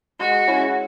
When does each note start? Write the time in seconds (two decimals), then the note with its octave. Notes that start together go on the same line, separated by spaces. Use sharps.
0.20 G#3 F#4
0.48 C#4 E4